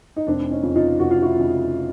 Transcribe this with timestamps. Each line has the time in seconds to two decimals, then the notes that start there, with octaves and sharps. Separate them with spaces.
0.16 D#4
0.27 F1 C4 D4
0.51 C#4 D#4
0.63 F2 C#3
0.76 D#4 F4
0.99 F1 F#4
1.11 F4
1.22 E4 F#4
1.35 F2 C#3